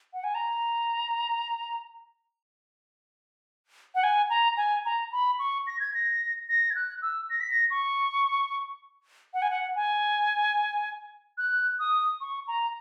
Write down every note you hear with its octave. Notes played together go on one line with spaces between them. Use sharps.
F#5
G#5
A#5
F#5
G#5
A#5
G#5
A#5
B5
C#6
A#6
G#6
A#6
A#6
G#6
F#6
E6
A#6
B6
A#6
C#6
F#5
G#5
F#5
G#5
F#6
D#6
C#6
A#5